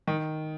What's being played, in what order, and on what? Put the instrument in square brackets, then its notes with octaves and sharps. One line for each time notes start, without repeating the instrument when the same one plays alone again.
[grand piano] D#3